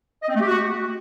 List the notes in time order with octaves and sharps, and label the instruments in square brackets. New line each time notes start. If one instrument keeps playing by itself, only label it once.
[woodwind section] D#5
C4
A3
G4
F#4